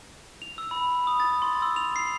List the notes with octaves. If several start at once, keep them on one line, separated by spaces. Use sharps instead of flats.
F7
E6
B5
D#6
A6
C6
E6
F7
C7